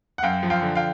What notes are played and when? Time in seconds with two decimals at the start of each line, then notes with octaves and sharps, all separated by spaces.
0.18 F#5
0.23 F#2 F5 G5
0.43 F3
0.50 F5 G5
0.62 D3
0.75 F5 G5